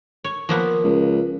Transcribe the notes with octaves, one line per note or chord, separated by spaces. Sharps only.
C#5
F3 A#3 B3
C#2